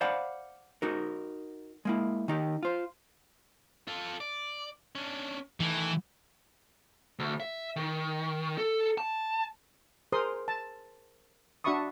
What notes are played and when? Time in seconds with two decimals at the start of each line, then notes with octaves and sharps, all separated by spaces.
0.01 C5 D5 F5 F#5 B5
0.82 D#4 F#4 A#4
1.85 G#3 A#3 E4
2.28 D#3 D#4 G4
2.63 F4 C5
3.88 F4 A4
4.20 D5
4.95 C#4 D4
5.60 D#3 E3 A3
7.19 D2
7.40 E5
7.76 D#3
8.58 A4
8.98 A5
10.12 G#4 A#4 C5 C6 D#6
10.48 A5
11.64 D4 F#4 E5 B5 C#6 D#6